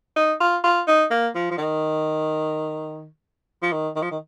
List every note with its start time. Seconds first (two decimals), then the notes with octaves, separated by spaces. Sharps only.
0.16 D#4
0.40 F4
0.64 F4
0.88 D#4
1.11 A#3
1.35 F3
1.51 F3
1.58 D#3
3.62 F3
3.72 D#3
3.96 D#3
4.02 F3
4.11 D#3